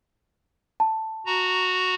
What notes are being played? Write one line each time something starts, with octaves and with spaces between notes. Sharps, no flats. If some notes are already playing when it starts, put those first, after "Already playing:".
A5
F#4 A#5